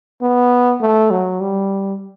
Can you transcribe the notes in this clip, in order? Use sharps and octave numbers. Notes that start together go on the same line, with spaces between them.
B3
A3
F#3
G3